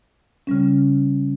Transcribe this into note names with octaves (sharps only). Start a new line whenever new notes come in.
C#3 G3 C#4